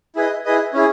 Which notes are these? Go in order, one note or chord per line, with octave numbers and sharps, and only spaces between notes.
E4 G#4 B4 D#5
E4 G#4 B4 D#5
C#4 E4 G#4